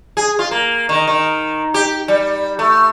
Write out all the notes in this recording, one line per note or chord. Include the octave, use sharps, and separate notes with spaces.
G#4
F4
A#3
D#3
D#3
G4
G3
A3